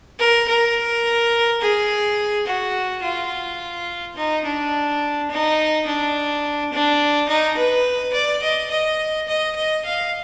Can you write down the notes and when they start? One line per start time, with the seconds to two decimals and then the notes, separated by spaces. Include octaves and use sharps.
0.19 A#4
0.48 A#4
1.61 G#4
2.47 F#4
3.03 F4
4.16 D#4
4.44 D4
5.30 D#4
5.86 D4
6.72 D4
7.28 D#4
7.57 B4
8.13 D5
8.42 D#5
8.70 D#5
9.27 D#5
9.56 D#5
9.84 F5